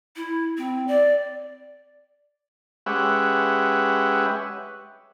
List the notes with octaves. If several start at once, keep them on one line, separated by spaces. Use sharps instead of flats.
E4
C4
D5
G#3 C#4 G4 B4 E5 F#5